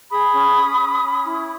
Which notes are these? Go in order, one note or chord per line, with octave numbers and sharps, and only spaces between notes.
G#4 B5 D#6
C#4
C#4
C#4
C#4
E4